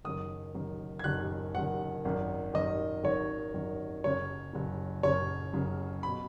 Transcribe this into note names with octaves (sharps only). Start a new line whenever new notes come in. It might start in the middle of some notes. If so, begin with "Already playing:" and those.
F#1 F#2 D#3 D#6
F#1 F#2 D#3
G#6
F#1 F#2 D#3 F#6
F#1 F#2 D#3 F#5
G#1 F#2 D#3
G#1 F#2 D#3 D#5
G#1 F#2 D#3 C#5
G#1 F#2 D#3
F#1 F#2 C#3 C#5
F#1 F#2 C#3
F#1 F#2 C#3 C#5
F#1 F#2 C#3
B2 B5